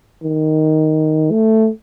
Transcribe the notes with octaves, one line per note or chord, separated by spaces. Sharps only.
D#3
A3